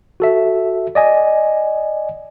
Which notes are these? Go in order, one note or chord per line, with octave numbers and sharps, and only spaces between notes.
F#4 A4 E5
D5 D#5 G#5